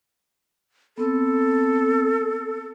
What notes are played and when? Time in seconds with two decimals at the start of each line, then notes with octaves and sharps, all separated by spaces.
0.98 B3 C4 A4